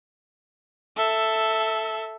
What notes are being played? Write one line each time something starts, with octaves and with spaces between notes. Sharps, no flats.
A4 E5